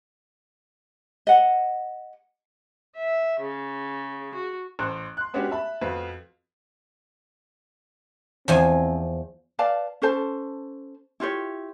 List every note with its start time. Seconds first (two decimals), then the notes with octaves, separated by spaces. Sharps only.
1.27 D#5 F#5
2.98 E5
3.40 C#3
4.34 F#4
4.79 A1 C5 F#6
5.17 C6 F#6
5.34 G#3 B3 C#4 D4 F#4 G4
5.51 E5 A5 B5
5.81 F2 F3 F#4 B4 F5
8.48 E2 F3 C4 G#5
9.59 B4 D5 F5 A5
10.02 C#4 A4 C5 A5
11.20 E4 F4 G4 C#5